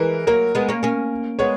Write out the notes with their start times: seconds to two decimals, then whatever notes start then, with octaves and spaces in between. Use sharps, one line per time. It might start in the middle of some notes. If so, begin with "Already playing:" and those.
Already playing: E3 G#3 A#4
0.27 F#3 A#3 A#4
0.55 G#3 B3
0.69 A#3 C#4
0.83 A#3 C#4
1.39 G#3 B3 C#5